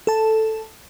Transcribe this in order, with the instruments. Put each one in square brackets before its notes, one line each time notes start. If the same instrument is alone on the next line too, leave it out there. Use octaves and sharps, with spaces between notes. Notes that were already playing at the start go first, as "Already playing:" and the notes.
[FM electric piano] A4 A5